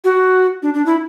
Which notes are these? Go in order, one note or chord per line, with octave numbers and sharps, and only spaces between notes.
F#4
D4
D4
E4